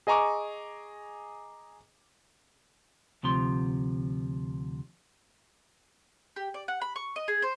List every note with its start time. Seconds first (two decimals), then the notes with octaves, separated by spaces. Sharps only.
0.07 G#4 D#5 G#5 A#5 C#6 D6
3.23 D2 C3 F3 C6
6.36 G4
6.54 D5
6.68 F#5
6.81 B5
6.96 C#6
7.16 D#5
7.28 G#4
7.42 C5